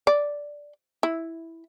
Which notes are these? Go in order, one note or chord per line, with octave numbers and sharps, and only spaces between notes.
D5
E4